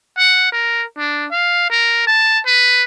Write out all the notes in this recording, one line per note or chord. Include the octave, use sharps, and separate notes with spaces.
F#5
A#4
D4
F5
A#4
A5
B4